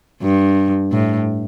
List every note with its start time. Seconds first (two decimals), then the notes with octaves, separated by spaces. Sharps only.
0.22 G2
0.92 A2